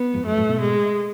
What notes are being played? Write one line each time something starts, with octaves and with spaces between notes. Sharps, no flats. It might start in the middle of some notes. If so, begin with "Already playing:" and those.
Already playing: B3
F2 G#2
F#2 A3
F#2 A2
G#2 B2
G#3